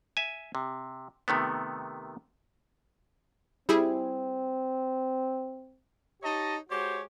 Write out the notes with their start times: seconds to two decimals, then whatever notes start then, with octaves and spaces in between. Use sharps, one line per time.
0.17 E5 G#5
0.55 C3
1.28 C3 D#3 A3 B3
3.69 G3 C4 E4 G#4
6.23 D#4 G4 C#5 D#5 A5
6.69 G#3 F#4 G4 C5 C#5